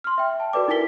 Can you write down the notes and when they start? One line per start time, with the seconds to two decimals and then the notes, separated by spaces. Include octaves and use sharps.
0.04 C6 F6
0.18 E5 G5
0.40 A5
0.53 F#4 A4 B4 D5 D6
0.68 D#4 E4 A#4 G#5 B6 G7